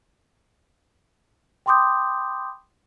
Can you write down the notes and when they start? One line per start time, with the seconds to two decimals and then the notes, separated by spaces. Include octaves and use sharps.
1.66 G5 B5 C6 D6 D#6 G6